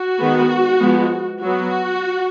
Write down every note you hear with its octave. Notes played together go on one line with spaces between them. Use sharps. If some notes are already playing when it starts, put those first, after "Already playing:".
Already playing: F#4
D#3 G#3 B3
F3 G#3 B3
F#3 B3 F#4